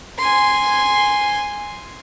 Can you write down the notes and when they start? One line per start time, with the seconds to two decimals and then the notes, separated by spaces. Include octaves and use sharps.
0.18 G#5 C6